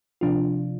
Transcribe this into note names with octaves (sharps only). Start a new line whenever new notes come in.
C3 F3 D4 F4